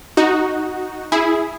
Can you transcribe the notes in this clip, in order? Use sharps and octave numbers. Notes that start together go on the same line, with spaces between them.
D#4 F#4
E4 G#4